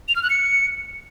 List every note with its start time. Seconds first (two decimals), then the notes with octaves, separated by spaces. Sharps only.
0.08 F7
0.16 F6
0.23 F#6
0.30 C#7